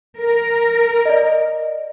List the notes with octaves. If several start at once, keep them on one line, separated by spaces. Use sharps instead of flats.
A#4
D5 D#5